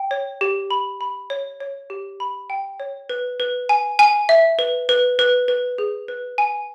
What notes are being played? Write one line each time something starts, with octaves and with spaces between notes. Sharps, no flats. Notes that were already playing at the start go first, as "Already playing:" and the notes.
Already playing: G5
C#5
G4
B5
B5
C#5
C#5
G4
B5
G5
C#5
B4
B4
G#5
G#5
E5
B4
B4
B4
B4
G#4
B4
G#5